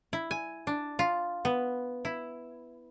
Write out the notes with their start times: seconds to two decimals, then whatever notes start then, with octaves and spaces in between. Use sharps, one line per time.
0.13 E4
0.31 G#5
0.67 D4
0.99 F4
1.45 B3
2.05 E4